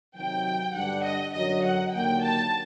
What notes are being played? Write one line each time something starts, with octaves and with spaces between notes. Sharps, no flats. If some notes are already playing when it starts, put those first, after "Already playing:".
C3 D#3 F#3 G5
G2 D3 G3 D4 F#5
D#5
F#2 D3 F#3 D#5
F#5
D#2 D3 F#3 A#3 G5
A5